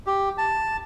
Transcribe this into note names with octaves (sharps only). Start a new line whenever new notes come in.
G4
A5